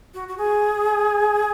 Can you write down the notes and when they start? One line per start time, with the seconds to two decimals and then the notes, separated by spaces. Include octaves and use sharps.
0.14 F#4
0.28 F#4
0.38 G#4